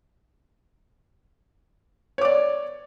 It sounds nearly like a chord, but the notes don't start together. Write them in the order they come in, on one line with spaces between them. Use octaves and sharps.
C#5 D6 D5